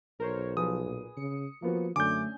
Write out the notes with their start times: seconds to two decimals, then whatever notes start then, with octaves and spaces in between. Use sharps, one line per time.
0.20 B1 A#4 C5 C#5
0.57 F3 G#4 B4 D#6
0.86 A#2
1.17 C#3 C#7
1.62 F3 A#3 B3 F#4
1.96 F#2 D3 A3 C#4 D4 G#5 D6 G6